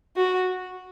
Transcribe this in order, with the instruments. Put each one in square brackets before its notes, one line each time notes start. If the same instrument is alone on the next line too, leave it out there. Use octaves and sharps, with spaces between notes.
[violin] F#4